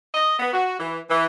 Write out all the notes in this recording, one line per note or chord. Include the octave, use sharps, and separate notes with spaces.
D#5
B3
F#4
E3
E3